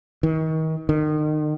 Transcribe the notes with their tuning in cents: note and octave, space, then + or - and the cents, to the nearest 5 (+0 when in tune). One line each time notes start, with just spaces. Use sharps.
D#3 +35
D#3 -30